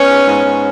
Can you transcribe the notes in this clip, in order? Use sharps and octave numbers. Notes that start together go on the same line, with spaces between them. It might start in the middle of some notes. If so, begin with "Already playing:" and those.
Already playing: B3 C#4
G#2
G#2
G#2